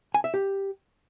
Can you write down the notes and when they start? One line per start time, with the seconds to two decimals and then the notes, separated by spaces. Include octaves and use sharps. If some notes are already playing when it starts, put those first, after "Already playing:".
0.14 G#5
0.24 E5
0.34 G4